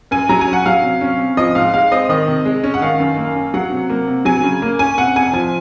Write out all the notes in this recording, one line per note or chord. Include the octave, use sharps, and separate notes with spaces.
F#2 G#5
F#3 A#5
G#5
C#4
F#5
F#3 F5
C3
C#4
C3
F3 D#5
G#2 F5
G#3 F5
C4 D#5
D#3 D#5
C3
G#3
C#4
F#5
D#3 F5
F#2
A#3
C#4
F#3 F#5
C3
A#3
C3
F#3 G#5
C#3
A#3
C#4 G#5
C3 F#5
F2 G#5
F3 G#5